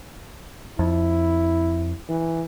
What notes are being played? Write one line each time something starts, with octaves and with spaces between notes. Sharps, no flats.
F2 E4
E3